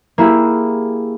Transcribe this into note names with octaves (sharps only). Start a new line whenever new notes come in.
A#3 E4 G4 G#4